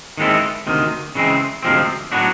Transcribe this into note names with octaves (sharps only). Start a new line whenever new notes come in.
D#3 G#3 C4 E4 A4
D2 C3 D#3
C#3 E3 G#3 C4
D2 C3 F3 G#3 C4
A2 F#3 B3 D4 F#4